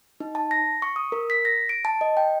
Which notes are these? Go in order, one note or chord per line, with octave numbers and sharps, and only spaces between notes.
D#4
A5
A#6
C#6
D#6
A#4
B6
A#6
D7
A5
D#5
G5